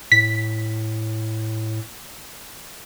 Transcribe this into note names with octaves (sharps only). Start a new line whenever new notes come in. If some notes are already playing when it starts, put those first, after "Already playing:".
A2 B6